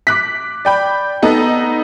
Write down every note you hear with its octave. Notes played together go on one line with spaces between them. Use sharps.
D6 F#6 B6
D5 G5 B5
B3 D#4 A4